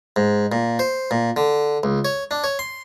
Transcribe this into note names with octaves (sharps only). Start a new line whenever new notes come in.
G#2
A#2
C5
A#2
D3
C#2
C#5
D4
C#5
C6